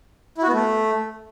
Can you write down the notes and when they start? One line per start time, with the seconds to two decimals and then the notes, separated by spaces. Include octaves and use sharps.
0.38 E4
0.43 F#4
0.48 B3
0.53 A3